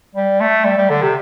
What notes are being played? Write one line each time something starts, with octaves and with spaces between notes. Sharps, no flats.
G3
A3
G3
G3
D3
C3